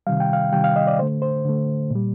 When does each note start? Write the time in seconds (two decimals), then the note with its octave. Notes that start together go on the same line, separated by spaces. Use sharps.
0.07 C3 D#3 G3 F5
0.20 G5
0.33 F5
0.52 C3 D#3 G3 G5
0.64 F5
0.76 D#5
0.87 D5
0.99 D3 A3 C5
1.22 C5
1.45 D3 A3
1.90 A#2 G3